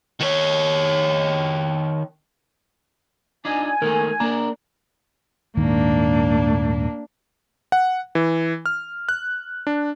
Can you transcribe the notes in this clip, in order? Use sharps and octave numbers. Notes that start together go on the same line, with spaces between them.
D#3 C#5
D4 D#4 F4 G#5
D#3 A3 A#3 A#4
A#3 D4 A#4 A#5
D#1 G#2 D#3 A#3 D4
F#5
E3
F6
F#6
D4